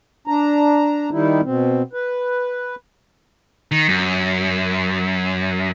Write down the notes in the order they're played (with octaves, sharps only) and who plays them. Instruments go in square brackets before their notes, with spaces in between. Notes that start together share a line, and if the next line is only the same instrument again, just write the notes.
[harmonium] D4 A#5
D#3 G3 D#4 E4
B2 C4
B4
[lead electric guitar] D#3
F#2